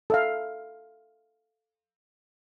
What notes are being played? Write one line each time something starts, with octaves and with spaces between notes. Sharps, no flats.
A4 E5 F5